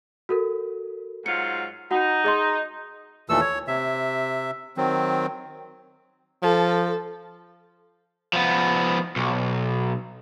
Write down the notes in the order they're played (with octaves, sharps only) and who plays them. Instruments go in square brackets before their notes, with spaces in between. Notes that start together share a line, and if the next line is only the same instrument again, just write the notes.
[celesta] F#4 A4 A#4
[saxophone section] G#2 F#3 F4 [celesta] C#7
[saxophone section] D#4 [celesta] F#4 F#5
[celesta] G#4 D#5 C6
[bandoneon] D#2 A#2 E3 A3 A4 E6
C#5
C3 E5
D#3 F#3 C4
[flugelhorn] F3 [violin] A4
[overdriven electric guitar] F3 B3
B1